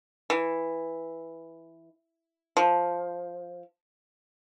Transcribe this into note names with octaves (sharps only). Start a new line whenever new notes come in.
E3
F3